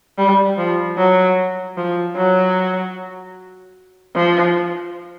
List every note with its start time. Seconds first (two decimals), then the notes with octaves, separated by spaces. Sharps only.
0.18 G3
0.57 F3
0.98 F#3
1.77 F3
2.16 F#3
4.15 F3